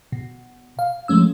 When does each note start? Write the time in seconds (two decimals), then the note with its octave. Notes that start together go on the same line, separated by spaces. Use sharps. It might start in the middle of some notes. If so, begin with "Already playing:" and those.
0.12 B2
0.79 F5
1.08 F3 G#3 A3 C#4 E6